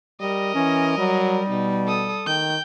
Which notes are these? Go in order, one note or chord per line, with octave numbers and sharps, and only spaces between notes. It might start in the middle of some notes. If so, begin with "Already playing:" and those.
G3 A#4 D#5
E3 C#4
F#3 G3
B2 D#4
A4 D#6
D#3 G5 G6